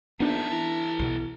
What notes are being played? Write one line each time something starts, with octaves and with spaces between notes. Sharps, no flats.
A#1 D3 B3 D4 D#4 E5 A5
E3 A4 A#5
B1 B2